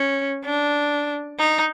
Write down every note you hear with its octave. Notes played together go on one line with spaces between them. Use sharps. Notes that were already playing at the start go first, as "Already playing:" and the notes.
Already playing: C#4
D4
D#4